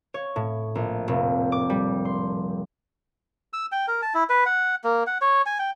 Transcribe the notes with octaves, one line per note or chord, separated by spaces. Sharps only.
C#5
A2
A#1
F1
D6
G3
C6
E6
G5
A#4
A5
E4
B4
F#5
A#3
F#5
C#5
G#5
G5